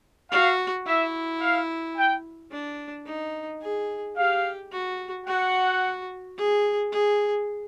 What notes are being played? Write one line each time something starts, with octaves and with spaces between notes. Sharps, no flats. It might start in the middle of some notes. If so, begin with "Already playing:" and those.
F#4 F5
E4 E5
F5
G5
D4
D#4
G#4
G4 F5
F#4
F#4 F#5
G#4
G#4